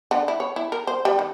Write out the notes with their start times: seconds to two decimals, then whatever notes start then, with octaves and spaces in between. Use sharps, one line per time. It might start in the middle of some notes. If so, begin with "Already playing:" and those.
0.11 D3
0.28 E4
0.40 C#5
0.56 E4
0.72 A#4
0.87 C5
1.05 G3
1.19 D#3